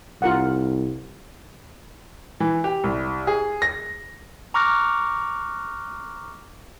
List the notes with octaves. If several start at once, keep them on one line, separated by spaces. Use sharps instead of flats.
C2 F4 A#4 F#5
E3
G4
C2
G#4
A#6
A#5 C#6 D6 F6 F#6 A#6